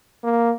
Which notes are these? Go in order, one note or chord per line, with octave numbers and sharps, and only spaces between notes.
A#3